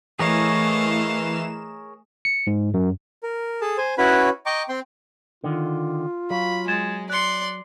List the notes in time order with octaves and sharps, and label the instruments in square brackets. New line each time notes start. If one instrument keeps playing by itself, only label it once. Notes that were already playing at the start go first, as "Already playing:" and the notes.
[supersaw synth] E3 E7 [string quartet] A3 D#5 F5 [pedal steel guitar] G#4 A#4 C#5
[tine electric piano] C#7
G#2
F#2
[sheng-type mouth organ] A#4
G#4 A4 A5
C5 G#5
C#4 E4 F#4 B4 C#5 B5
D#5 G5 A#5 C#6 D6
C4 G5 C6
[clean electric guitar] D3 D#3 [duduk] F4
[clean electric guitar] F#3 [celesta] F5 [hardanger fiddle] B5
[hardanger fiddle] G#3 [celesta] G#6 A6 E7
[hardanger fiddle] D5 C6 [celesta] F#6 C#7